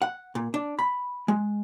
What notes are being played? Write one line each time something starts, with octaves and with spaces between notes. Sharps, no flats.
F#5
A#2
D4
B5
G#3